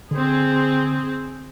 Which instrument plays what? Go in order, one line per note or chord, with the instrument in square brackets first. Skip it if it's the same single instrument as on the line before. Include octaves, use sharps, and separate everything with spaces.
[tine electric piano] D3 [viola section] C4 G#4